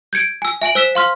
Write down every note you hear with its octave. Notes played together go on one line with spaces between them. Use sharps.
G6 G#6 C#7 D7
G#5 E6
E5 G#5 D7 F#7
C5 E6 B6 E7
F5 C6 F6